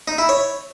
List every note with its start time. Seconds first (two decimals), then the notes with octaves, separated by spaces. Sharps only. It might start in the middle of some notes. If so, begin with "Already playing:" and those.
0.08 D#4
0.18 E4
0.29 C#5